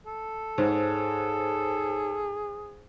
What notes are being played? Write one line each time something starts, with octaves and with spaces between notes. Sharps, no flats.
A4
G#2 D#4 G#4 C5 C#5